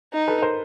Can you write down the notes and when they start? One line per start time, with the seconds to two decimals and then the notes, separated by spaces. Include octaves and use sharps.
0.13 D#4
0.28 A4 B4
0.42 A#4 C5